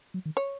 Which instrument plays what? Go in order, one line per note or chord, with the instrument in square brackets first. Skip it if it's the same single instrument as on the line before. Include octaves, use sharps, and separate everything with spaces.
[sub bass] F#3
D#3
[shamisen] C#5